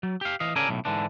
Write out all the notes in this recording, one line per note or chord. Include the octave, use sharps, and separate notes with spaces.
F#3
G4 F5
E3 D#5 F5
C#3 C#4 A4 A#4 D5 G#5
B1 A2
G#2 D3 E3 D4